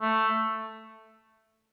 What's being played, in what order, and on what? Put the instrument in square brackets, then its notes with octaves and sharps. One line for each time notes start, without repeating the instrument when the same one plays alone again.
[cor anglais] A3